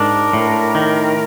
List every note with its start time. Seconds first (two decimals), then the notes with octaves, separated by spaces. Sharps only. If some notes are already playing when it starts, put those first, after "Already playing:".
Already playing: G#2 D4 A#4
0.33 A2
0.75 D#3